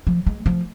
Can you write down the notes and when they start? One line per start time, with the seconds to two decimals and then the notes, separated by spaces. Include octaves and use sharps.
0.07 F3
0.26 G#3
0.46 F3